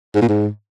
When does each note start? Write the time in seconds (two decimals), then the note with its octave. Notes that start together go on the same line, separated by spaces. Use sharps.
0.15 G#2
0.22 A#2
0.29 G#2